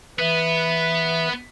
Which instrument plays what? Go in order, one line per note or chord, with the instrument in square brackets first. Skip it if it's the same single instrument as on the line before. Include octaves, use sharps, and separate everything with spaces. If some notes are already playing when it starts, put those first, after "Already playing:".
[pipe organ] E3 B4 E5 [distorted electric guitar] B3